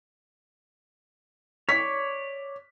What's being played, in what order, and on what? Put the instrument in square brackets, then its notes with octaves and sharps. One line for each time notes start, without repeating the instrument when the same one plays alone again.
[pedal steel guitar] C#5 D5 [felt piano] B6